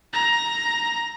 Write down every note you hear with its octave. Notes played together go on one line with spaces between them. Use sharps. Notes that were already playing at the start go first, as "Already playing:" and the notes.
A#5